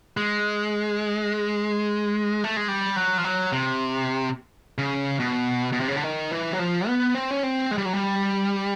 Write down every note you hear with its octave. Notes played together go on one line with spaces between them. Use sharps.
G#3
A3
G#3
G3
F#3
F3
F#3
C3
C#3
B2
B2
C3
C#3
D3
D#3
E3
F#3
F3
B3
C4
C#4
C4
G#3
G3
F#3
G3